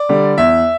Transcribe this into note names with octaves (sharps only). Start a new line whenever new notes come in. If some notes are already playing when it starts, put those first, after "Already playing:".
Already playing: D5
D3 G3
E2 E5